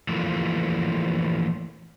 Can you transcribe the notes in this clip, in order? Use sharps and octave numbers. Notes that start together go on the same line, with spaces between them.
E3 F3 A3 A#3